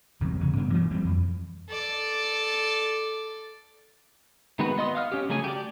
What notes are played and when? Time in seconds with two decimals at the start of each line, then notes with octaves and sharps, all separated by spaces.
0.21 G1 E2 C3 F#3
0.39 E2 C#3 C#4
0.57 G2 B2 B3 D4
0.73 E3 F#3 A#3
0.90 E3 G3 G#3 C4
1.05 F2
1.69 A4 D5
4.59 D#3 G#3 B3 F#4 B4
4.78 B3 D#5 C6 D#6
4.95 F5 F#5 D#6 F6
5.12 C#4 G4
5.29 C#3 F#3 A3 G#4 G#5
5.44 G4 D5